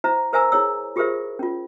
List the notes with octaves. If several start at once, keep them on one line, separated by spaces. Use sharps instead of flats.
E4 C5 E5 A#5
A#4 C5 E5 G#5 A#5 E6
E4 G#4 C#5 E6
F4 G4 G#4 A#4 C5 E5
C#4 F4